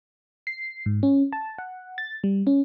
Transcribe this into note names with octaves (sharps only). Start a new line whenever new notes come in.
C7
G#2
C#4
A5
F#5
A6
G3
C#4